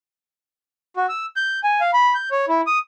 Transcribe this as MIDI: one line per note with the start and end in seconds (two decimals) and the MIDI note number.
0.97 1.06 66
1.09 1.26 88
1.36 1.60 91
1.64 1.80 80
1.81 1.91 77
1.93 2.14 83
2.15 2.29 91
2.31 2.45 73
2.49 2.61 64
2.67 2.79 87